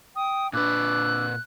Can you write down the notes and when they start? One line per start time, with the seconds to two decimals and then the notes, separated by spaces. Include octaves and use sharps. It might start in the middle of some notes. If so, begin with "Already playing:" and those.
0.16 G5 D#6
0.53 A#2 D4 B4 D6 E6 F#6